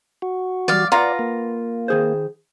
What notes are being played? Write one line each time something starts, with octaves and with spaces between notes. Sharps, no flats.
F#4
E3 G3 D5 F5
F4 B4 D5 F5 F#5 A#5
A#3
D#3 G#4 C5